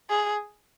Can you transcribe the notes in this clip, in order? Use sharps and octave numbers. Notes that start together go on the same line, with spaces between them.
G#4